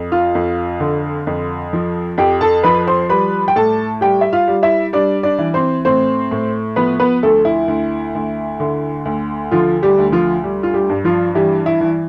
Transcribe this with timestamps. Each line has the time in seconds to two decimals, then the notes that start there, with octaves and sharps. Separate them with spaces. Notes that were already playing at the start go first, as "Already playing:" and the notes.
Already playing: F2
0.12 F4 F5
0.35 F2
0.80 D3
1.27 F2
1.73 F3
2.18 F2 G4 G5
2.41 A4 A5
2.63 F3 B4 B5
2.87 C5 C6
3.09 G3 B4 B5
3.48 G5
3.56 A2 A4 A5
4.01 G3 G4 G5
4.21 E5
4.33 F4 F5
4.48 G3
4.63 E4 E5
4.93 G3 D4 D5
5.23 D4 D5
5.39 E3
5.54 C4 C5
5.85 A2 C4 C5
6.31 A2
6.76 F3 B3 B4
7.00 B3 B4
7.23 D2 A3 A4
7.45 E4
7.68 D2
8.15 D2
8.60 D3
9.05 D2
9.51 D3 F3 F4
9.83 G3 G4
9.98 D2
10.12 F3 F4
10.44 G3
10.63 F4
10.74 G3 G4
10.90 G2
11.05 F3 F4
11.35 E3 G3 G4
11.66 E4
11.81 E3